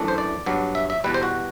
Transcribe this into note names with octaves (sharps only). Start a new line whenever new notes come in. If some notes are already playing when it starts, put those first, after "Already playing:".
Already playing: F#2 E3 A3 D4
C5
D5
G2 F#3 B3 D4
E5
E5
E2 B2 G3 B4
C5
F#4